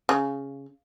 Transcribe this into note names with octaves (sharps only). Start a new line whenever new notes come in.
C#3